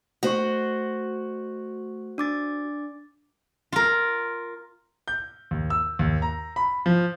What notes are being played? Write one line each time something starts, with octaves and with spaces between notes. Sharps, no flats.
A3 F#4 C5 C#6
D4 D6 A6
F4 A#4
G6
D#2
E6
D#2
A#5
B5
F3